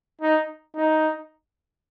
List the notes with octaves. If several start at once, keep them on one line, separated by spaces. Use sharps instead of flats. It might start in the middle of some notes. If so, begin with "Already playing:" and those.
D#4
D#4